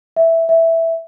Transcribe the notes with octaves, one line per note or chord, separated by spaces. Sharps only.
E5
E5